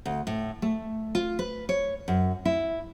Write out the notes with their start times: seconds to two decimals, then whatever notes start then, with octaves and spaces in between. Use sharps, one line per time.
0.05 D2
0.27 A2
0.62 A3
1.15 F4
1.39 B4
1.69 C#5
2.08 F#2
2.45 E4